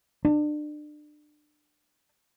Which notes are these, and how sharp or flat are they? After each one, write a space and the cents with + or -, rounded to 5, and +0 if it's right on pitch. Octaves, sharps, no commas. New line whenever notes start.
D4 +30